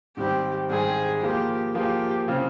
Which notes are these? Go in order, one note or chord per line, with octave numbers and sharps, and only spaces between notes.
G#2 D#3 G3 C4 G4
G#2 D#3 G3 C4 G#4
F3 A#3 F4 G4 G#4
F3 A#3 F4 G4 G#4
C#3 F3 C4 F4